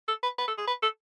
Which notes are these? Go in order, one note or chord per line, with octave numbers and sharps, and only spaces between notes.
A4
B4
B4
A4
G#4
B4
A4